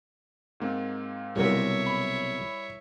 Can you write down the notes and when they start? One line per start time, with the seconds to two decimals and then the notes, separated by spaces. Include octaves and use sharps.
0.60 G#2 A#3 C4
1.36 B1 C3 G3 E4 F#4 A#4 C#5 E5
1.87 B5